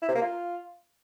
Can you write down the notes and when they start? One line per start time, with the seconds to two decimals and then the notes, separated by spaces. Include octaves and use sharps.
0.02 E4
0.09 C3
0.15 A#3
0.22 F4